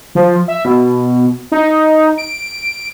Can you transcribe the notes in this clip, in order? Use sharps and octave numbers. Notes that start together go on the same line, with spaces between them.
F3
E5
B2
D#4
D7